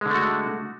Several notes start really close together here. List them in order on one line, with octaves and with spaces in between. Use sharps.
G#3 D3 A3 F#4